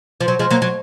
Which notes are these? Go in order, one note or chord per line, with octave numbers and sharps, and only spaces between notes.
F3
F#3
F3 G#3
F#3 A#3
F#3